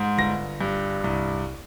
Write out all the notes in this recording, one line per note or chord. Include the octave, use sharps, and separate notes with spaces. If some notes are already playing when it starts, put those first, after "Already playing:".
Already playing: G#2
G1 A#6
G2
C2